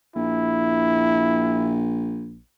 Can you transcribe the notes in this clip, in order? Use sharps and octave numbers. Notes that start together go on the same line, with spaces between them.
A#1 E4